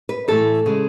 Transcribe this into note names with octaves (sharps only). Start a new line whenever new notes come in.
B4
A2 E3 A3 A4
C#3 G#3